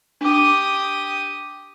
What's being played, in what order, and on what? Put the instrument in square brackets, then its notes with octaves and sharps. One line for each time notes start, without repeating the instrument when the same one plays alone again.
[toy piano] D4 D6 [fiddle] G4 D#6